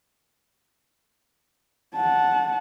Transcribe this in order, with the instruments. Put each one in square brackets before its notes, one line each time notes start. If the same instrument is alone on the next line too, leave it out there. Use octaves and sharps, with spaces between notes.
[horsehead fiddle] F#5 A5